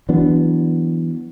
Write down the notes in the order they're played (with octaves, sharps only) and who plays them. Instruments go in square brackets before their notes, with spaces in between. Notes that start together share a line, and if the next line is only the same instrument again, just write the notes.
[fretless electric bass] E3 F#3 B3 D4